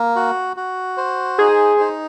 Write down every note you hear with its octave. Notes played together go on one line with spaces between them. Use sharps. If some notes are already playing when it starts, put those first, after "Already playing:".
Already playing: A#3
F#4
F#4
C5
D#4 G#4
D#4